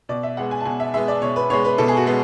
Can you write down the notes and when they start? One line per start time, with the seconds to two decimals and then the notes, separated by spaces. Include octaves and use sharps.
0.09 B2 D5
0.23 E5
0.37 G#3 B3 F#5
0.51 G#5
0.60 A5
0.65 B2 G#5
0.80 E5
0.94 G#3 B3 E5
1.08 D5
1.21 B2 C#5
1.36 B4
1.50 G#3 B3 C#5
1.65 B4
1.78 B2 A4
1.88 G#4
1.97 F#4
2.06 G#3 B3